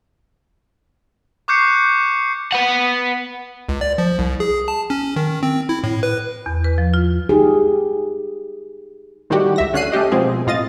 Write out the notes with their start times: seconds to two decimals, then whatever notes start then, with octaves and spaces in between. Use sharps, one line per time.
1.48 C#6 D6 F#6 G6 C7 C#7
2.52 B4 F#5
3.69 C#2
3.81 D5
3.98 F3
4.19 C2
4.40 G#4
4.68 A5
4.90 C#4
5.16 D#3
5.43 C4
5.69 E4
5.84 A2
6.03 B4
6.46 E2
6.64 B4
6.78 F3
6.94 F4
7.29 D#4 G4 G#4
9.30 A2 D#3 G3 F#4 G4
9.56 C#2 E5 A#6
9.73 D3 C#4 F#6 C7 D#7
9.92 A3 C#4 G4 D#5
10.12 B2 F3 G#3 C4 F4 G#4
10.47 A2 F4 D#5 A6